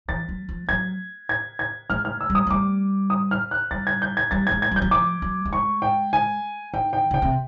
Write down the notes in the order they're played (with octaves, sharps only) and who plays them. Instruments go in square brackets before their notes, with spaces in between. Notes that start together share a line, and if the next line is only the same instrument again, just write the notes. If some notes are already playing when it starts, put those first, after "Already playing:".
[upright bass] E3 [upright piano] A6
[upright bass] F#3
F3
[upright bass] F#3 [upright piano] G#6
[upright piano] G#6
G#6
[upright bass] G#3 [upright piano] F6
[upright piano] F6
E6
[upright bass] G3
[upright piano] D#6
[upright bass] F#3
[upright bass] G3 [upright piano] D6
[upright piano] D#6
F6
F#6
[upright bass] G3 [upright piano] A6
[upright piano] G#6
G6
G#6
[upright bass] G3 [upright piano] A6
[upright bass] G#3 [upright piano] G#6
[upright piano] G#6
[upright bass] G3 [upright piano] G6
[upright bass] F#3
[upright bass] F3 [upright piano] D6
[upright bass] F#3
G3
[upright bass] G#3 [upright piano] C#6
[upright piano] G5
G#5
[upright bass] D#3 [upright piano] G5
[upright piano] G5
[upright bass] C#3 [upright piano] G5
[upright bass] C3